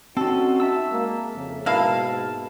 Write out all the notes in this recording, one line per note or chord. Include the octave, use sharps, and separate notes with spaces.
C4 C#4 D#4 F#4 A4
E5 A5 E6
G#3 A#3
F2 C#3
G#2 B2 A#3 E4 F5 A5 F6